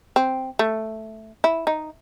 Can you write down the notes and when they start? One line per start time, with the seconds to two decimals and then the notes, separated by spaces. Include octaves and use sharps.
0.16 C4
0.59 A3
1.44 E4
1.67 D#4